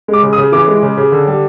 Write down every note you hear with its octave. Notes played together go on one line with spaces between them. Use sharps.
G#3
D6
C#3
D#6
C#3
E3 D6
G#3
C#3
C#3
D3
G3